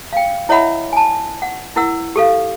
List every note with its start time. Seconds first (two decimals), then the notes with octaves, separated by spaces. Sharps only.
0.13 F5 G5
0.49 E4 C#5 D#5 E5 F#5 B5
0.93 G#5 A5
1.42 F#5
1.76 E4 A#4 F#5 E6
2.16 G4 A4 F5